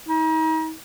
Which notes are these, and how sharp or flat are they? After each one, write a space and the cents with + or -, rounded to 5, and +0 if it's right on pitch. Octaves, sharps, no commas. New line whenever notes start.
D#4 +40